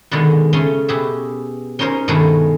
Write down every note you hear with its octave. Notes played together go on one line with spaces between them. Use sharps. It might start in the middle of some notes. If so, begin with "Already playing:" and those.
B2 D3 D#3 G#3
C#3 A3 C#4 C#5 C6
B2 G4 G#4 E5
C#4 D#4 A#4 C5 C#5
G2 B2 D#3 G#3 A3 G#4